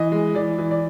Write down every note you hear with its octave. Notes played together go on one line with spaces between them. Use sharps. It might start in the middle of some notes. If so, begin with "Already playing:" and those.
Already playing: E3 D#5
G#3
E3 D5
E3
D5